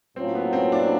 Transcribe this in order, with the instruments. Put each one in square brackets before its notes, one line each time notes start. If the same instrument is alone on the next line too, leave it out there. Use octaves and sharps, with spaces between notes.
[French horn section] A2 F#3 A#3 C#4 F4 [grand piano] C4
[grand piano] B3
C4
D4